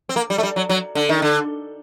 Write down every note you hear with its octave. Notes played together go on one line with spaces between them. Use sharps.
C4
A#3
G3
A3
G3
F#3
F#3
D3
D#3
D3